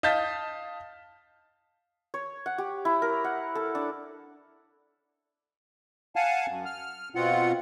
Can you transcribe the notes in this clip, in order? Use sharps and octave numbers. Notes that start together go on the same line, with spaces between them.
D#5 F5 A5 G6 A6 B6
C#5
F#5
G4
E4
A#4
F#5
A4
D4
F5 F#5 G#5 A5
F#2
F6
B2 C4 F4 F#5